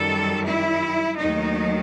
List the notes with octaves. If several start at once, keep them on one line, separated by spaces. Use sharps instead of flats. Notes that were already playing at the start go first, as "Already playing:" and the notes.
Already playing: F#2 D#3 G3 A4
E4
D#2 D#3 F#3 A3 D#4